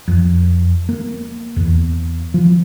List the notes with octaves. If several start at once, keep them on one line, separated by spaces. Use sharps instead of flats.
F2
A#3
E2
F3